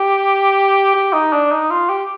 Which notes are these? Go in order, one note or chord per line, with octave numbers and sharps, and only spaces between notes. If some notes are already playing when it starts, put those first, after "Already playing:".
Already playing: G4
G4
D#4
D4
D#4
F4
G4